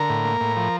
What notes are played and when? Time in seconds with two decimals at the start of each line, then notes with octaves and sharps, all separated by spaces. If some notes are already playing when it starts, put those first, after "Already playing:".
Already playing: D3 A#4 A#5
0.09 A2
0.25 A#3
0.41 A2
0.56 F3